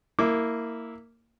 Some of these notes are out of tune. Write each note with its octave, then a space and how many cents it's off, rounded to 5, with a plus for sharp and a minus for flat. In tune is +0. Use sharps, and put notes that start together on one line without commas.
A#3 -15 E4 -10 D6 +5